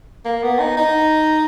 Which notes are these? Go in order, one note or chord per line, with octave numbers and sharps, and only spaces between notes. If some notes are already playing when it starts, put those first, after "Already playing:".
A#3
B3
D#4
D#4